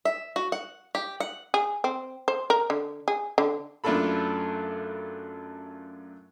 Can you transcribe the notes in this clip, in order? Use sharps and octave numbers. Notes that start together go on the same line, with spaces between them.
E5
F#4
F#5
G4
F#5
G#4
C4
C5
A#4
D3
G#4
D3
F#2 A3 D4 F4 A4 B5